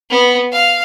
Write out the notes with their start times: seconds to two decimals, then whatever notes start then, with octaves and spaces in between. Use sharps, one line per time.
0.10 B3
0.52 F5